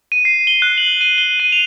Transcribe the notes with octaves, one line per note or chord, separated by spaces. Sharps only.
D#7
C7
G7
F#6
F#7
D#7
G7
D#7
F7